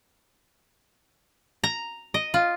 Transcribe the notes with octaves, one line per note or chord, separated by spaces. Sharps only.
A#5
D#5
F4